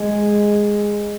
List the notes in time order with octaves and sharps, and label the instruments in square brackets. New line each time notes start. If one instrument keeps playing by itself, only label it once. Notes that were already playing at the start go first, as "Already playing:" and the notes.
Already playing: [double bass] G#3